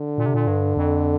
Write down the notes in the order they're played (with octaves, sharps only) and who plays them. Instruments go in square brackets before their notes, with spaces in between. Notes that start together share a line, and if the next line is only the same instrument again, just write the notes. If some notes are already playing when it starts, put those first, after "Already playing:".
Already playing: [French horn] D3
[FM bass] A#2
C3
A#2
G2
F2